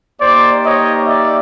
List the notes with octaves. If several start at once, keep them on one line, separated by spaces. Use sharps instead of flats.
A#3 D#4 G4 C5 D5
C#5 D#5
D5 E5